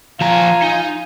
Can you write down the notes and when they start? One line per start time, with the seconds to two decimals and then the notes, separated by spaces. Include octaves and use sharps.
0.21 F3 F4 G#5 A#5
0.62 D#4